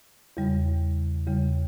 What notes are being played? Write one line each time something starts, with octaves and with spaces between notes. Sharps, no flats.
E2 C#3 G3
E2 C#3 G3